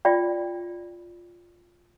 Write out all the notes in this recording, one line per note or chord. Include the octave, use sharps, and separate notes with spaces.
F4 D5 G5